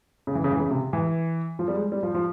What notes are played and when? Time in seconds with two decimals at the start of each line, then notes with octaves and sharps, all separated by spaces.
0.27 C#3
0.35 E3
0.44 C#3
0.52 E3
0.60 C#3
0.71 C3
0.93 E3
1.59 F3
1.68 G3
1.76 G#3
1.92 G3
2.03 F3
2.14 F3